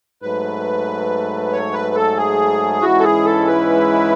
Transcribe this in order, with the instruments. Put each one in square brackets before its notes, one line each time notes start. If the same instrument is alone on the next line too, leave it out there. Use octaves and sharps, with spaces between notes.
[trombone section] G#2 F#3 A3 [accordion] B4
[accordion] C#5
B4
A4
G#4
[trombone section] G#2 E3 G#3 C#4 E4 [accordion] F#4
[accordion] A4
G#4
A4
B4